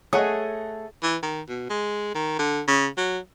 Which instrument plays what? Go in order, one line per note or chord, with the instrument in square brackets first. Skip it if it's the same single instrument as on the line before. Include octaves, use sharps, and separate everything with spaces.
[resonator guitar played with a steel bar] A3 [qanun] G#4 [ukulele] C#5 [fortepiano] D#5 F#5 D#6
[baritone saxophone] E3
D#3
B2
G#3
D#3
D3
C#3
F#3